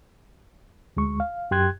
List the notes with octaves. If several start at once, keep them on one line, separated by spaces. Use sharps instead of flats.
D2 G#3 C#6
F5
F#2 G4 G5 C6 F#6 G#6